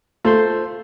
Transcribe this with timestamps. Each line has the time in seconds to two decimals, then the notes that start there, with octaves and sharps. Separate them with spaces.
0.25 A3 F4 C5 C6